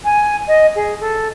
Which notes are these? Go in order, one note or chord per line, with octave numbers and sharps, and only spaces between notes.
G#5
D#5
G#4
A4